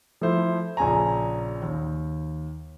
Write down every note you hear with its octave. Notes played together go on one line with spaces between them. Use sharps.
F3 A3 E4 C5
A#1 C#3 G#5 A#5
D#2